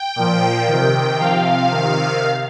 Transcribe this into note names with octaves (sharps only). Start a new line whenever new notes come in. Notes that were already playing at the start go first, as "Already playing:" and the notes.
Already playing: G5
A#2 F3
C3 D#3
C3 F3 F5
C3 D#3